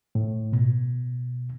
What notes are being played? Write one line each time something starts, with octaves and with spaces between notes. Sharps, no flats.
A2
B2